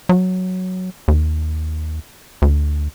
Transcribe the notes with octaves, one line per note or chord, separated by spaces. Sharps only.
F#3
D#2
D2